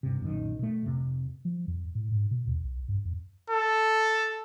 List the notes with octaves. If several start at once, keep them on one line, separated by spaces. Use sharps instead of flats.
G2 C3
B1 F#2 A#2 D#3
B2 A3
F2 C3
F3
F2
A2
G#2
B2
D#2
B1
G2
F2
A4